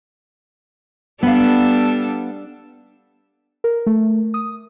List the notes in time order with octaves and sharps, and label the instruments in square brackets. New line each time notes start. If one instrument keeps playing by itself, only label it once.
[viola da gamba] G3 D4 A4 [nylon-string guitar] B3 F5
[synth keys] A#4
A3
D#6